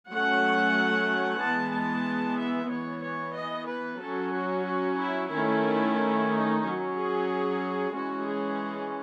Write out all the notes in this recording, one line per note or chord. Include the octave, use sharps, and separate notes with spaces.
F#3 A3 C#4 F#5
E3 G#3 B3 A5
A5
E5
E3 B3 C#5
C#5
D#5
B4
F#3 C#4 A4
F#4
F#4
E4
D#3 A3 C#4 E4
D#4
F#3 C#4
G#4
E3 G#3 C#4 F#4
G#4